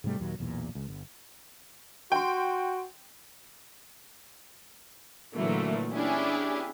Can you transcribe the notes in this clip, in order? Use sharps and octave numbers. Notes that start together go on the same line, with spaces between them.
G#2 C3 G3 A3
D#2 A#2 F#3
B1 E2 A#2
C#2
G1
F#4 G5 C6
A#2 D3 E3 F#3 A3 A#3
B3 C#4 D4 E4 G4 G#4